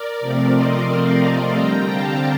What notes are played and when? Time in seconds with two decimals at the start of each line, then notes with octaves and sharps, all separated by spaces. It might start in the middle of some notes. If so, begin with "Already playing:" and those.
Already playing: A#4 D5
0.20 C3 F3 A3 C4
0.54 C5 D#5
0.88 D5 F5
1.21 D5 F5
1.55 D3 G3 C4 G5 A#5
1.89 F5 A5